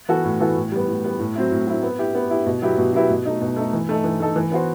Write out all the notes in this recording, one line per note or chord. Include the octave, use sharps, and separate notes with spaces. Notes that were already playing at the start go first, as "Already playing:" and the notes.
E3 B3 F#4 A4
A2
E3 B3 F#4 A4
A2
G3 B3
A2
G3 B3
A2
F#3 C4 E4
A2
F#3 C4 E4
B3
E4 G4
B3
E4 G4
B2
F#3 B3 E4 G4
B2
F#3 B3 E4 G4
B2
A3 D#4
B2
A3 D#4
E3
A3 D#4 A4
E3
A3 D#4 A4
E3
B3 F#4 C5